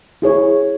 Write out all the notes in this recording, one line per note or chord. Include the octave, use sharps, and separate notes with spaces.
E4 G#4 C#5